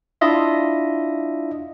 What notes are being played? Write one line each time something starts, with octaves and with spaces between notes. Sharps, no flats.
D4 E4 F4 D#5 E5